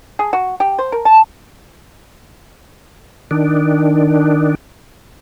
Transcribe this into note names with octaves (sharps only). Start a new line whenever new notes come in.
G#4
F#4
G4
C5
A#4
A5
D#3 D4